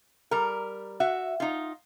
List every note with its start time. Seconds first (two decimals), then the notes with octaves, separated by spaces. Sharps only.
0.31 G3 A#4
1.00 F#4 E5
1.40 D#4 F4